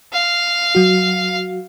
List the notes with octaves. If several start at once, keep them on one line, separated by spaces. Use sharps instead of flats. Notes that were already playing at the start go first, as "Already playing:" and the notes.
F5
F#3 F#4